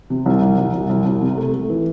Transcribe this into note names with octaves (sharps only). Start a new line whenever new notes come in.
C3
C2
C2
C2
C2
C2
C2
C3
A3
A3
E3